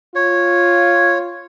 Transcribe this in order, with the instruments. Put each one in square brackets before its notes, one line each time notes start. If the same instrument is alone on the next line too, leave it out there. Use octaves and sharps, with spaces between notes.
[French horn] F4 [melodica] C#5